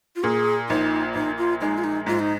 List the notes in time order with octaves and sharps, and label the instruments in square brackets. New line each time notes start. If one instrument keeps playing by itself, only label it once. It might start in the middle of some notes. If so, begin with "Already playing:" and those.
[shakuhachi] F4
[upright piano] A#2 [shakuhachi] G#4
[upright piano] A#1 [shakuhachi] D#4
[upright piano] A#1 [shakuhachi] D#4
[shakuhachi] F4
[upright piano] G#3 [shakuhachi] D#4
[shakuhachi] F4
D#4
[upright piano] G#2 [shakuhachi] F4
[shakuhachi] D#4